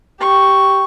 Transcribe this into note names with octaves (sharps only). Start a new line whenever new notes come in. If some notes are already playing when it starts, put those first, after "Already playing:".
G4 C#6